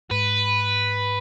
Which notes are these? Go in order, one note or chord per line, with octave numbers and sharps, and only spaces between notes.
G#2 B4